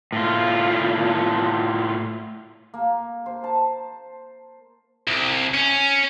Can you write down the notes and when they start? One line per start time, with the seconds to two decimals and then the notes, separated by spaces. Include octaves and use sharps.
0.13 A2 F4
2.74 A#3
3.26 C5
3.44 A5
5.07 C2
5.54 C#4